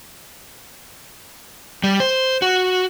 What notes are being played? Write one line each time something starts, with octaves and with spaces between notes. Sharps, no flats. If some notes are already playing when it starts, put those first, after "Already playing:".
G3
C5
F#4